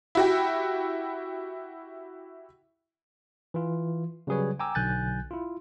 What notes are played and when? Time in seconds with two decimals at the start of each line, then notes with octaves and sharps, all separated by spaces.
0.15 E4 F#4 G4
3.54 E3 F4
4.27 C#3 F#3 G3 G#4 B4 C#5
4.59 G5 G#5 A#5 D6 E6
4.75 B1 D3 G#5 F#6 G6 A6
5.31 E4 F4